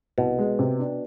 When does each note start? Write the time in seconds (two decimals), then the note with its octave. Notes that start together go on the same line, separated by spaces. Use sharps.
0.18 C2 B2
0.38 G#3
0.59 C3
0.79 D4